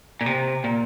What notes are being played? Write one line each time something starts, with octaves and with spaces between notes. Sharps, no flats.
A#2
C3
A#2